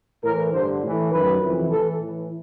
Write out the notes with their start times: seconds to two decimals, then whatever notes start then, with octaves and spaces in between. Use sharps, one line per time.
0.23 A2 E3 A#4
0.53 G2 D3 C5
0.82 A2 E3
1.11 F#2 D#3 B4
1.40 F2 C3 E3
1.69 A2 E3 A4
1.99 A2 E3